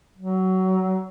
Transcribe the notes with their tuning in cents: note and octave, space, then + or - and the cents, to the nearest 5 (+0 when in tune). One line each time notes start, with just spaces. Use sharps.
F#3 +20